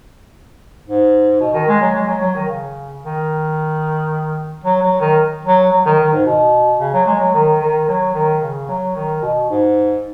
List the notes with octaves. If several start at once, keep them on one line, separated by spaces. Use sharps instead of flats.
G#2
B2
D#3
G#3
F#3
G#3
F#3
F#3
D#3
C#3
D#3
F#3
F#3
D#3
F#3
F#3
D#3
D#3
G#2
B2
C#3
F#3
G#3
F#3
D#3
D#3
F#3
D#3
C#3
F#3
D#3
B2
G#2